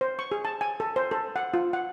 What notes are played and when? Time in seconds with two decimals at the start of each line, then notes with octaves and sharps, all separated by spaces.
0.01 C5
0.19 C#6
0.32 G#4
0.45 A5
0.61 G#5
0.80 A4
0.96 C5
1.11 A4
1.36 F#5
1.54 F4
1.73 F#5